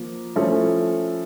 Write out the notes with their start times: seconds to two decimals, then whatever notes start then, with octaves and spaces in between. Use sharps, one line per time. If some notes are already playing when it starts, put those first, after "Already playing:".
Already playing: F3 A#3
0.36 F3 A3 C#4 E4 A4